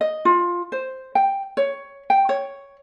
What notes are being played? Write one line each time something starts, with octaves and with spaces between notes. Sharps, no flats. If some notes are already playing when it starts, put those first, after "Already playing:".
D#5
F4
C5
G5
C#5
G5
C#5